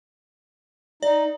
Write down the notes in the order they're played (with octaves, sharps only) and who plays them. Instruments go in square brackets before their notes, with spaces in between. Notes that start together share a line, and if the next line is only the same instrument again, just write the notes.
[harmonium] D#4 [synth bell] D5